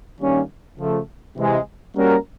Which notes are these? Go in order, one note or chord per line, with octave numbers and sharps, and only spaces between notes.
G2 D#3 G3 A#3 C#4
C#3 F3 A3
C3 E3 G#3
G3 A#3 C#4 F#4 A#4